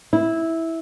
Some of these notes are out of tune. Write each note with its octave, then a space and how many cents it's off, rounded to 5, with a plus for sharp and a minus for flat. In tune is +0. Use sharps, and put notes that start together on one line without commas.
E4 -10